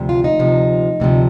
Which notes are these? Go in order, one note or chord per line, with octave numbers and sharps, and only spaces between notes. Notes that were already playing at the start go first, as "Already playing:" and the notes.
Already playing: D2 C3 F3
F4
D#4
D2 C3 F3
D2 C3 F3